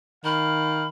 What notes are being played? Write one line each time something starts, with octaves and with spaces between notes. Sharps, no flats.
D#3 F5 B5